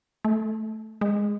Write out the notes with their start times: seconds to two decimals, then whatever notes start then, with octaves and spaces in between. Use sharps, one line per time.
0.25 A3
1.01 G#3